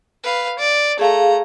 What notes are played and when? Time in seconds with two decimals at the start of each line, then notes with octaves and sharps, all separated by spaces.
0.23 B4 F5
0.59 D5
0.99 A3 G#4 F5 A#5